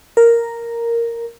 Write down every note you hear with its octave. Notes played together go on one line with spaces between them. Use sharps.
A#4